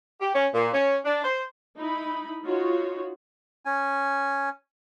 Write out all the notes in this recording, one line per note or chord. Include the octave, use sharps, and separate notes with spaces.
G4
C#4
A#2
C#4
D4
C5
D#4 E4 B5
D#4 F4 F#4 C#5
C#4 G#5